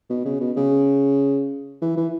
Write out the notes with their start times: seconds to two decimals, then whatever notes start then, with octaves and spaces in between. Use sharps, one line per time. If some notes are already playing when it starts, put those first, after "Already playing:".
0.10 B2
0.25 C#3
0.40 B2
0.57 C#3
1.82 E3
1.97 E3